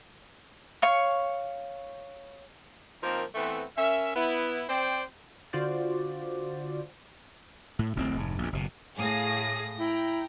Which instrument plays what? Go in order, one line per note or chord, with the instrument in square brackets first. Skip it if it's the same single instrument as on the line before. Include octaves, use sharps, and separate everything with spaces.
[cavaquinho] C#5 F5 C#6
[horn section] F3 A#3 C4 D#4 A#4
E3 A3 B3 C4
C#4 A#4 E5
B3 E4
C4 C5 D5 G5
[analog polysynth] D3 F4 F#4 C5 D5
[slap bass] A2
D1 A1 F2 C4
F1 G#2
A#1 E2
F#1 B2
[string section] A2 A#6 [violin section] G#4 F5 D#6
[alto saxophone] E4 [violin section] G5 A#5